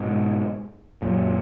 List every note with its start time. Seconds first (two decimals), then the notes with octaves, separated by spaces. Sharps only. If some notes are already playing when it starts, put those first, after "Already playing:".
Already playing: G#2 B2
1.02 F#2 A#2